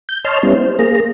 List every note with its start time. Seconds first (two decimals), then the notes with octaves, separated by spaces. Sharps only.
0.09 G6
0.25 C#5 D#5 A5 C6 F6
0.43 G3 B3 C#4 E4
0.54 C5
0.79 A#3 G#4 A#5